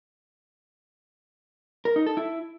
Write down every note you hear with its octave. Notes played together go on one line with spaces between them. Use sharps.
A#4
D#4
A4
E4